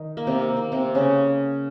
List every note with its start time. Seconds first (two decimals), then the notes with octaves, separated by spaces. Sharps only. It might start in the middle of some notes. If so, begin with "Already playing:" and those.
Already playing: D#3 D#4
0.17 A#3
0.27 C3 C4
0.42 A#3
0.57 A#3
0.72 C3 C4
0.95 C#3 C#4